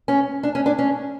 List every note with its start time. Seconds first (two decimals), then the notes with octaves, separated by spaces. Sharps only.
0.08 C#4
0.43 D4
0.55 C#4
0.66 D4
0.79 C#4